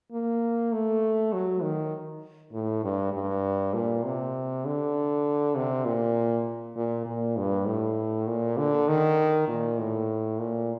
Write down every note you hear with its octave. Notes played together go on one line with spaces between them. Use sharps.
A#3
A3
F#3
D#3
A2
G2
G2
A#2
C3
D3
C3
A#2
A#2
A#2
G2
A2
A#2
D3
D#3
A#2
A2
A#2